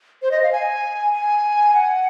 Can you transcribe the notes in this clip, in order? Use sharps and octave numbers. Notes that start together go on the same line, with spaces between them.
C5
D#5
F5
G#5
G#5
F#5